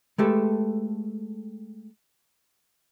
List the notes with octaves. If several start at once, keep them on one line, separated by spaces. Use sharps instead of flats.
G#3 A3 G4 A4 B4